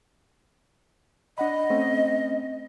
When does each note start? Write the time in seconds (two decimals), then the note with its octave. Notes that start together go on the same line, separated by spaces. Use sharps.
1.38 D4 D#5 F#5 B5
1.70 A3 C4 C#4